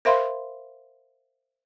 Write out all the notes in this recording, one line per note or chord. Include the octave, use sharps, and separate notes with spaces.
A#4 C5 E5 F5 B5 C6